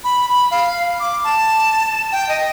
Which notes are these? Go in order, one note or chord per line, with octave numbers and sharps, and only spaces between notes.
B5
B5
F5
D6
A5
G5
D#5